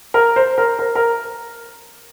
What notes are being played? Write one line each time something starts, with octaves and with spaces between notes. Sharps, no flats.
A#4
C5
A#4
A#4
A#4